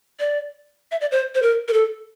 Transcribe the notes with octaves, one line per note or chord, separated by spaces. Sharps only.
D5
E5
D5
C5
C5
A#4
A#4
A4